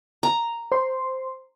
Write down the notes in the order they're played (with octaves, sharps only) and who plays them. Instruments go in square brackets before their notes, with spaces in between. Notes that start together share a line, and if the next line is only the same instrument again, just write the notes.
[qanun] A#5
[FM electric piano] C5 C6